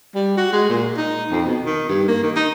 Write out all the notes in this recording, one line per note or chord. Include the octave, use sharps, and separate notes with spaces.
G3
F#4
G#3
A#2
D#4
F2
B2
D#3
G2
A#3
D#3
D#4